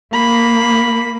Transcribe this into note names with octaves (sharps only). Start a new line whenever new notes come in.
A#3 B5